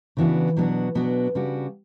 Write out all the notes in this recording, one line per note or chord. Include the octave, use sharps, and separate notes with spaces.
C#3 E3 B3 D4 F#4
B2 F#3 B3 D4 F#4
B2 F#3 B3 D4 F#4
C#3 G3 D4 F#4